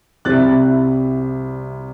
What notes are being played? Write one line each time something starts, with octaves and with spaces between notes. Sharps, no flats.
C2 C3 G3 C4 E4 F#6 A6